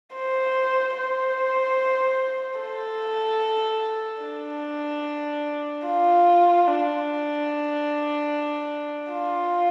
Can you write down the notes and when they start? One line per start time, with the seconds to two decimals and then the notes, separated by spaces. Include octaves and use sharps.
0.15 C5
0.97 C5
2.60 A4
4.23 D4
5.86 F4
6.67 D4
9.13 F4